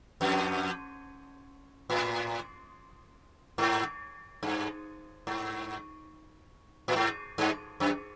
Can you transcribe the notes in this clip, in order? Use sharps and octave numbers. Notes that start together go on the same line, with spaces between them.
F2
A2
G#2
G2
G#2
A2
G#2
G2
F#2